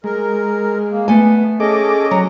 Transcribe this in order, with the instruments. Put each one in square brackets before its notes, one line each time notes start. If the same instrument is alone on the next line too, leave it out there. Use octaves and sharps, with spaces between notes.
[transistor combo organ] G#3 [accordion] A#4
[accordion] A#3
[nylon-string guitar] A3 G#5 [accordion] B3
[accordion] C#4 D#5 [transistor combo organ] G#4 A4 D6
[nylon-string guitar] F#3 [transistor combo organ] A#5